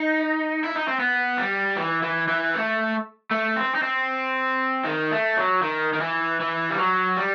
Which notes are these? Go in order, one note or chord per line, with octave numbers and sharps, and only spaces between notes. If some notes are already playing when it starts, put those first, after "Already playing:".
Already playing: D#4
E4
D#4
C4
B3
G3
E3
E3
E3
A3
A3
C4
D#4
C4
D#3
A3
F#3
D#3
D#3
E3
E3
G3
F#3
G3